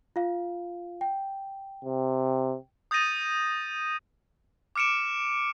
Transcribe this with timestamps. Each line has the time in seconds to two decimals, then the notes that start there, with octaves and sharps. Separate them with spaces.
0.16 F4 F5
1.01 G5
1.85 C3
2.91 D#6 G6 A6 A#6 D#7
4.76 D6 F6 C#7 D7 E7